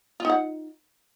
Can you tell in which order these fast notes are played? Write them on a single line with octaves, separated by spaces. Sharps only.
F4 D#4 F#5